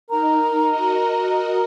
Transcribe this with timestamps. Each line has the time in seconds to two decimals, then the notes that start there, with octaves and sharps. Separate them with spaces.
0.10 D#4 A#4 A#5
0.66 F#4 D#5